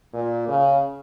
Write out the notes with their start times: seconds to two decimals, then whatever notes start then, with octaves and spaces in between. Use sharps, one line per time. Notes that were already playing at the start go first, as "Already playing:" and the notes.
0.13 A#2
0.48 C#3